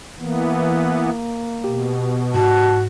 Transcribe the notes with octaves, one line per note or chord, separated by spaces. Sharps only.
E3 A#3 B3
B2 G4
G#2 F#4 A5